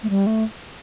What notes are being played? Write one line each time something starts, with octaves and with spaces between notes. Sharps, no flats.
A3
G3
A3